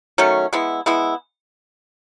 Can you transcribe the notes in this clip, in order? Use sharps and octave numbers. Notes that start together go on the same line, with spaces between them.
D#3 F#3 A3 C#4
G#3 B3 E4
G#3 B3 E4